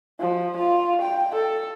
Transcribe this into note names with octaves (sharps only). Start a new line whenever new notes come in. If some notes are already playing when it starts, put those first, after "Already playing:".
F3
F4
G5
A4